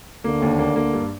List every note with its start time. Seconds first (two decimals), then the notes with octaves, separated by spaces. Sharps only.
0.24 D2 D3 A#3
0.42 D#2
0.58 A#3
0.76 A#3
0.93 G2